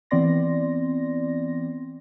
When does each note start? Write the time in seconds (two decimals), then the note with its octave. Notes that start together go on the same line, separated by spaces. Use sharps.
0.11 E3 B3 C4 D5 C6 A#6